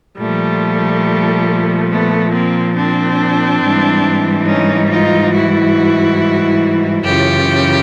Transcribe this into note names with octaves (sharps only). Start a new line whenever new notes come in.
A#2 F3 G3 A3
A3 B3
A#3 C4
C4 D4
G#2 E3 G3
C#4 D#4
D#4 F4
E4 F#4
F#2 C#3 E3 F4 G4